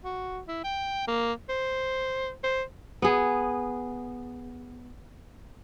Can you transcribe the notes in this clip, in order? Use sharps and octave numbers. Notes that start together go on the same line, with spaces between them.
F#4
E4
G5
A#3
C5
C5
B3 G#4